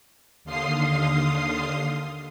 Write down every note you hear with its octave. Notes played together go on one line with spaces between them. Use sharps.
D#2 D3 F5 C6 D#6 C7